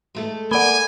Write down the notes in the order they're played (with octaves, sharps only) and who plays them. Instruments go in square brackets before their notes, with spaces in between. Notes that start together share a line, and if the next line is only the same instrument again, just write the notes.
[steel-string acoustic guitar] G#3 A3 A4
[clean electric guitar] A#3 D5 [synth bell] F#5 B5 [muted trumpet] G#5